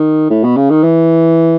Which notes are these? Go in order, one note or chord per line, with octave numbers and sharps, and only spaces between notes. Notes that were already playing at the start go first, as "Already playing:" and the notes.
Already playing: D#3
A2
B2
C#3
D#3
E3